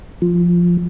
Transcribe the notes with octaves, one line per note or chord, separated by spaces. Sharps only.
F3